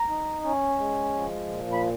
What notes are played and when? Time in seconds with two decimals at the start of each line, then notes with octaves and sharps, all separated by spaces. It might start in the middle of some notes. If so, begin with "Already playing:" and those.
Already playing: A#5
0.09 D#4
0.44 C#4
0.78 G#3
1.14 F3
1.48 A#2
1.73 B5